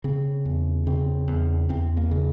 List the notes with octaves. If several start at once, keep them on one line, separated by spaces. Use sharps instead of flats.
C#3 C4
E2
C#3 C4
E2
E2 C4
A#3
C#3